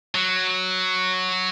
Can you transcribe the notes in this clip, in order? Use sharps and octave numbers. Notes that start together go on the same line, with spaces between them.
F#3